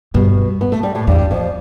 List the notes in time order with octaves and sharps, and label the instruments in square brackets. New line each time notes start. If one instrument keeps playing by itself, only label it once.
[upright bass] G2 [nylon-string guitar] B2 B3
[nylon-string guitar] B3
A3
G3
A2 A3
[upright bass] E2 [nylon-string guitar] G2 G3
[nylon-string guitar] F2 F3